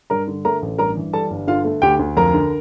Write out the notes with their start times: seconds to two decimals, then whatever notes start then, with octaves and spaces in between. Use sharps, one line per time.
0.10 G2 A#4 A#5
0.28 D3
0.45 A3 A#4 A#5
0.62 A1
0.78 G2 A#4 A#5
0.97 E3
1.13 G3 A4 A5
1.31 G1
1.47 D3 F4 F5
1.65 A3
1.82 D2 G4 G5
1.99 D2
2.17 F2 A#4 A#5
2.34 D3